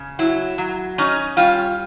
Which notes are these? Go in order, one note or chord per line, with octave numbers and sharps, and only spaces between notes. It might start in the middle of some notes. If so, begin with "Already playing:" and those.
Already playing: C#3
F#3 E4
F#3
C#4 D#4
G3 F4